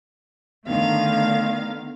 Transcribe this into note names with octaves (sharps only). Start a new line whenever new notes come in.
D3 D#3 A3 B3 F5